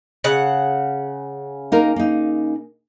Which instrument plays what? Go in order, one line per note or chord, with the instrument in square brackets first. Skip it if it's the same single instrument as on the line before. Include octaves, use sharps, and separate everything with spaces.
[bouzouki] C#3 F#5
[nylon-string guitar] A#3 D#4 A#4
A#3 D#4